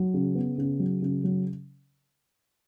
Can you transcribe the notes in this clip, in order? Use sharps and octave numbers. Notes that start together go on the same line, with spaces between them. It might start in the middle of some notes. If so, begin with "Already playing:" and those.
Already playing: F#3
C#3
B3
C#3
F#3
C#3
F#3